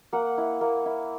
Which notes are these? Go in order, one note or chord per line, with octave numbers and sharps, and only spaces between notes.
A#3 F#5
E4
A#3
E4